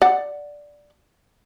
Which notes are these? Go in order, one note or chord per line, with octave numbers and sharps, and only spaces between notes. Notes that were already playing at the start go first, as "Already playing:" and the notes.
D5 F#5